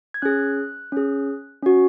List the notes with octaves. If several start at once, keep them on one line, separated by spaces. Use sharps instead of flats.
G#6
C#4 G#4 F#6
C#4 G#4
C#4 F#4